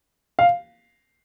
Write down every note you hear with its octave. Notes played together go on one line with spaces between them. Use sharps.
F5